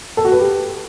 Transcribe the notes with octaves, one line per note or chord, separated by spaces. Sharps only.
A4
F#4
B4
G4